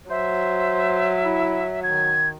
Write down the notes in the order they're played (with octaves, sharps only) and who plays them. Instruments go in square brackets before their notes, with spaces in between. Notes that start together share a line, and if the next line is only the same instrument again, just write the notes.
[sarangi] F#3 [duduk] C5 [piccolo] E5
[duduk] E4
[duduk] D#3 [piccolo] G#6